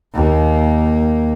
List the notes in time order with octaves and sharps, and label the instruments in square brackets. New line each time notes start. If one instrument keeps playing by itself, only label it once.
[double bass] D#2 A#3